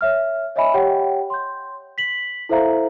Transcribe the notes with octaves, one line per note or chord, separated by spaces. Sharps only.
C#5 E5 F6
C#5 D#5 E5 G#5 B5
G4 C#5 F#5 G5
C6 G6
B6 F#7
E4 A4 C5 E5 F5 A#5